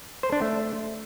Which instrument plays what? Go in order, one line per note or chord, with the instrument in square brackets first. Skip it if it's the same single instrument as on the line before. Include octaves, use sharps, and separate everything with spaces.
[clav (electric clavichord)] C5
D4
A3